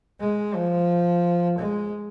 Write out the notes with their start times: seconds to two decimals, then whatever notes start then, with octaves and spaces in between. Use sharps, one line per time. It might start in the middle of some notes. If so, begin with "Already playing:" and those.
0.20 G#3
0.55 F3
1.59 G#3